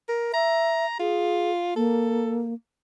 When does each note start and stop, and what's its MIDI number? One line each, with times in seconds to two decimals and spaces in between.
0.08 0.29 70
0.33 0.86 76
0.33 0.95 82
0.99 1.72 65
0.99 1.51 68
1.76 2.54 58
1.76 2.45 69